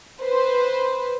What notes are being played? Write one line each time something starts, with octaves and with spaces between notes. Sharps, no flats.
B4 C5